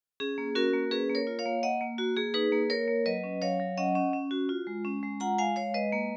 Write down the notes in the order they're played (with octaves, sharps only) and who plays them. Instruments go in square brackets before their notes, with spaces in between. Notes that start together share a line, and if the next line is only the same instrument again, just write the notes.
[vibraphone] C#4 G#4
A#3
C#4 F#4 A#4
A#3
C#4 G#4 B4
A#3
A#4 C#5
F4
C#5 F5
A#3
A#3 D#5 F#5
A#3
A#3 F#4
A#3 G#4
D#4 G#4 B4
A#3
A#3 A#4 C#5
A#3
F#3 B4 D#5
C#4
F#3 C#5 F5
F#3
C#4 D#5 F#5
C#4
C#4
F#4
F4
G#3
C#4
G#3
F4 F#5 A#5
G#3 F5 G#5
G#3 C#5 F5
G#3 B4 D#5
A#3